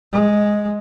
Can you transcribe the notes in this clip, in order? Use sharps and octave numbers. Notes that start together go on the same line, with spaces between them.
G#3